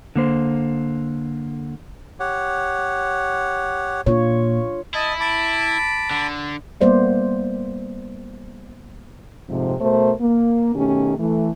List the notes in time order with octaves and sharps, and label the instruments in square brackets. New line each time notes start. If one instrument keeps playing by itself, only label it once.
[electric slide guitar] D3 A#3 C5
[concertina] G4 C#5 F#5
[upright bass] A#2 [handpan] D4 F4 C#5
[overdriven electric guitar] E4 [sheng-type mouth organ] D#5 A5
[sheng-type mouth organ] A5 B5 D6
[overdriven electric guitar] D3
[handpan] G3 A#3 B3 C5 D5 E5
[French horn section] F2 G#2 C3
B2 A3 A#4 C5
A#3
B2 D#3 A3 C#4 G4
E3 A3